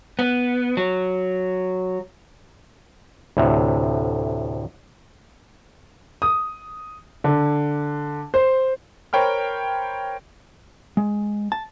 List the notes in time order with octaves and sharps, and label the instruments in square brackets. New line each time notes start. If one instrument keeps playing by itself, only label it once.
[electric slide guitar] B3
F#3
[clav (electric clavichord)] D2 A2 C3
[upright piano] D#6
D3
C5
[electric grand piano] A#4 C5 C#5 G5 B5 F6
[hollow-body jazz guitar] G#3
A5